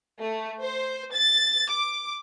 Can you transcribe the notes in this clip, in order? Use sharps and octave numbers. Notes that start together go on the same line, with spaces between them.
A3
C5
A6
D6